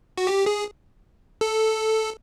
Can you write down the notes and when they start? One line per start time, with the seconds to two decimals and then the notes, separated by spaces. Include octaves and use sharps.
0.18 F#4
0.27 G4
0.46 G#4
1.41 A4